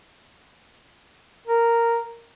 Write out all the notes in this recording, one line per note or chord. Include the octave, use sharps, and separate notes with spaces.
A#4